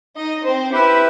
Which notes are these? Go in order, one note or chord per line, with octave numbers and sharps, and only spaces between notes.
D#4 D#5
C4 C5
E4 G4 B4 E5